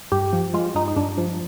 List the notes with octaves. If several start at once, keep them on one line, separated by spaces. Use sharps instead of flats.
G2 G4
F3
G#3 F4
G2 D#4
D#4
G2 D4
F3